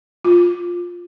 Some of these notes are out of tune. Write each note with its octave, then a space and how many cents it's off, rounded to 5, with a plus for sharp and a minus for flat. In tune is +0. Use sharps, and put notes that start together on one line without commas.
F4 +10